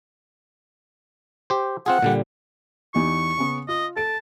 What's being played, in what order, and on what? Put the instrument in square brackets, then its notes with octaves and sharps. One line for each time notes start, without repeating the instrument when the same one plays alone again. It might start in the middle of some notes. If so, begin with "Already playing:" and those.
[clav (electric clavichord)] G4 C5
[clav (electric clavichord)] C4 F4 G#4 [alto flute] F#5
[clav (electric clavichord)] A#2 D3 G3
[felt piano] E2 D#4 G4 [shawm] C#6
[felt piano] C#3 B3
[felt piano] F4 [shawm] D#5
[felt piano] A4 D7 [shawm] A5